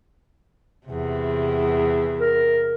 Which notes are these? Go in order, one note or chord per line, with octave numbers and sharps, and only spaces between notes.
E2 C3
A#4